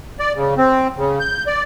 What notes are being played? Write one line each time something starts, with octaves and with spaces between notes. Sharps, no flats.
D5
C#3
C4
C#3
G6
D5